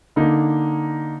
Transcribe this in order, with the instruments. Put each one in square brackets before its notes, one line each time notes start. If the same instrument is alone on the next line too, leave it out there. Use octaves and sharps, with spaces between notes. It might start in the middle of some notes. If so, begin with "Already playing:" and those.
[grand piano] D3 A#3 D#4